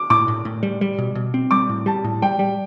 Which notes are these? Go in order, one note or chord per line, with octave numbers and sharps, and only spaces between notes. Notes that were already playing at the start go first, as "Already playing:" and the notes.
Already playing: D6
A2 D6
A2
A2
G3
G3
B2
B2
C4
G3 D6
A2
G3 A5
A2
G3 G5
G3